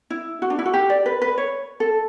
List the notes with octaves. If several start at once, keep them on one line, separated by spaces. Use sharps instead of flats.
E4
F#4
D4
E4
F#4
G4
D5
B4
B4
C#5
A4